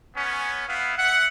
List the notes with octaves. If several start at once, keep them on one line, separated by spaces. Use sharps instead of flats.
B3 C#4
B3 E4 F5
E5 F#5